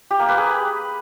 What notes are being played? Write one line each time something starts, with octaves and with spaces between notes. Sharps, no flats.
G4
A#3
B4
G#4